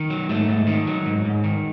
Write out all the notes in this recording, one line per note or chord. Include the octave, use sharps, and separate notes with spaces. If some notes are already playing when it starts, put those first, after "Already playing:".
Already playing: D#3
F#3
G#2 A3
G#2
D#3
F#3
G#2
G#2
D#3